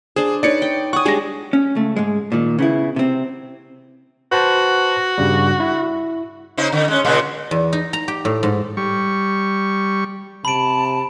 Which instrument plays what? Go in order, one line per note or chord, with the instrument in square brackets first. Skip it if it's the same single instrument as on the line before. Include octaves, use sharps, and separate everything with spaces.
[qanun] D4 C5 [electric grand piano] G#4
[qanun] D#4 B4 C#5 [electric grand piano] D5 C#7
[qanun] G5
[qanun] F#5 G#5 [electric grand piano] C#6 D#6
[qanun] G3 G#3 D4 [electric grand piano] G#4 A#6
[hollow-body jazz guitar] C#4
C#2 A3
G#2 G#3
A#2 D#3
C#3 B3 E4
C3 C4
[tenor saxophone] F#4 [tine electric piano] B4 C5 A5
[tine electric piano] G2 C#3 G3
E4
[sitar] C#3 D#4 C5
D3
G#3 C#4
A#2 C#3 G#3
[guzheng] E2
D#4
A#5
G4
A2
G#2
[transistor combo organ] G3 C#6
[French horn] C3 [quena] A5 [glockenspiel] B5 D7